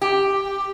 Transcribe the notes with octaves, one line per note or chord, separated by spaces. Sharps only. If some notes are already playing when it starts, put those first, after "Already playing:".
G4